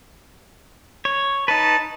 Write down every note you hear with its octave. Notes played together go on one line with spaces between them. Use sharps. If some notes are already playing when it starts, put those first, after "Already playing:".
C#5
D#4 B4 A5